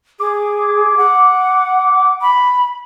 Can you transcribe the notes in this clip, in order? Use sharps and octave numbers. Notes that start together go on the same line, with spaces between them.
G#4 D6
F#5
B5